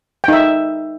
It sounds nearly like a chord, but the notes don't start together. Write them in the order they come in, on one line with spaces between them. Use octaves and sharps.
G5 D#4 E5